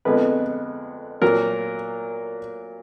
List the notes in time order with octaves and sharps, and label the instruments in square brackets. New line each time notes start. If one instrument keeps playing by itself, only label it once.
[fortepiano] F2 D3 G#3 B3 B4
A#2 F#3 A#3 A#4